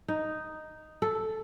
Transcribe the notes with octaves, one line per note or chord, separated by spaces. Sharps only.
D#4
A4